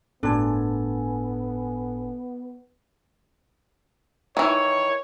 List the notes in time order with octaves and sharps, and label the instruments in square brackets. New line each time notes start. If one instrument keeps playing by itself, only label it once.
[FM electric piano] G1 A2 G#5 [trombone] B3 [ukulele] D4 [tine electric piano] A4
[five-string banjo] D#3 E3 [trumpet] C#5